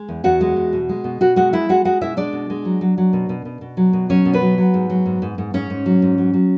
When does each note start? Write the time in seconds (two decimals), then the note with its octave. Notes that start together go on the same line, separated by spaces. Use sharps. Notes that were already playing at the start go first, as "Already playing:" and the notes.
Already playing: G#3
0.09 E2
0.24 E2 F#4 F#5
0.41 G#3
0.56 E2
0.73 B2
0.89 G#3
1.04 B2
1.21 B2 F#4 F#5
1.36 G#3 F#4 F#5
1.53 G#3 E4 E5
1.69 G#3 F#4 F#5
1.85 G#3 F#4 F#5
2.01 B2 E4 E5
2.17 G#3 D4 D5
2.33 B2
2.50 G#3
2.65 F#3
2.81 F#3
2.98 F#3
3.13 B2
3.29 B2
3.45 B2
3.61 B2
3.77 F#3
3.93 B2
4.10 F#3 C#4 C#5
4.25 B2
4.34 B3 B4
4.42 F#3
4.58 F#3
4.74 G#2
4.90 F#3
5.06 G#2
5.22 G#2
5.38 G#2
5.54 G#2 C#4 C#5
5.70 G#2
5.86 F#3
6.02 G#2
6.18 F#3
6.34 F#3